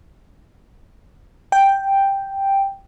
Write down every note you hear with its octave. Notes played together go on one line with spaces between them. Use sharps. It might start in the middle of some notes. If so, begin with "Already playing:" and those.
G5